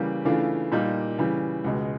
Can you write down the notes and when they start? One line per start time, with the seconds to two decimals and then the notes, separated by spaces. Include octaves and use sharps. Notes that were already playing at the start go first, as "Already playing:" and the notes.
Already playing: C#3 E3 G3 A#3
0.25 C#3 E3 A3 D4 F4
0.72 A#2 G3 A#3 D#4
1.18 C#3 E3 G3
1.64 C#2 B2 G#3